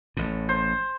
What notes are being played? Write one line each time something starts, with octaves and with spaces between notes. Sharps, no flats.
A1 A2
C5